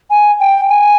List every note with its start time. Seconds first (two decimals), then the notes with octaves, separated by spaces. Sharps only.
0.10 G#5
0.40 G5
0.70 G#5